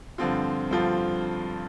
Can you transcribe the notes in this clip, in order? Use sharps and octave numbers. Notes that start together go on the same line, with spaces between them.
G2 D3 F3 C4 F4
G2 D3 F3 C4 F4